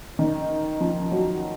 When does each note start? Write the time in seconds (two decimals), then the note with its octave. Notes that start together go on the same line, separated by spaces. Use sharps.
0.19 D#3
0.81 F3
1.12 F#3